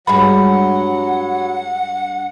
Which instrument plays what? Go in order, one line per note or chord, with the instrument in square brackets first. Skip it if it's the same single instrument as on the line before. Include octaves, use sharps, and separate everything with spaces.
[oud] G2 G#3 [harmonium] F#3 [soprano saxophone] F#5 [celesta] B5